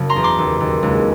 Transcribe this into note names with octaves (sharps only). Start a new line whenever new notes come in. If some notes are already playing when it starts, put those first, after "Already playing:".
Already playing: F#1
A#5 C6
E2
C6 D6
D#2
D#2
C#2